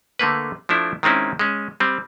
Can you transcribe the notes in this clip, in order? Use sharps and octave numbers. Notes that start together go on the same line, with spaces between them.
D3 A3 A#3 B4
F3 A3 D4 E4
D#3 G#3 C4 C#4 E4
G#3 C#4
G3 C4